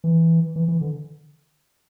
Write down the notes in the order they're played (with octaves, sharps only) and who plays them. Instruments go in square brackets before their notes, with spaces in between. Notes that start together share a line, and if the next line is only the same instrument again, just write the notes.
[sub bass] E3
E3
E3
D3